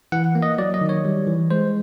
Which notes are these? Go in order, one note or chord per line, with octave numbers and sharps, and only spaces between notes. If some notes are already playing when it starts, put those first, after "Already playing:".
E3 F#5
A#3
D#5
F#3 D5
D#5
D#3
C#5
G3
E3
G#3 C5